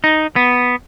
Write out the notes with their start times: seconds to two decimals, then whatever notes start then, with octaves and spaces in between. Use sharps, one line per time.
0.04 D#4
0.36 B3